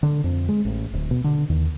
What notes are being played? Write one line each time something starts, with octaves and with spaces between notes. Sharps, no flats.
D3
F2
G#3
A1
D1
B2
D3
D#2